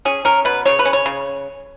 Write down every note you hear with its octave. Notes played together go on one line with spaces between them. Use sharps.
C#4 G#4
C#4 A#4
B2 B4
C#3 C#5
B4
C#4
C#5
C#3